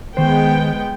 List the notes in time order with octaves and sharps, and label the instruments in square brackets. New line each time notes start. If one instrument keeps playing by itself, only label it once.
[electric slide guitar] D#3 C5 [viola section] G#3 B3 G5